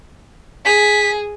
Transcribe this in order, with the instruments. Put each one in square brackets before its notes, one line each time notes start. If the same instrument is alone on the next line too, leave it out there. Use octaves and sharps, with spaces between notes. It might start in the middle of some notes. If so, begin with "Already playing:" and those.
[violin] G#4 [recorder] B6